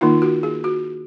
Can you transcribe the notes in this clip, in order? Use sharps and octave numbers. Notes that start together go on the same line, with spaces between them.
D#3 A#3 D#4 F4
F#4
G#4
F#4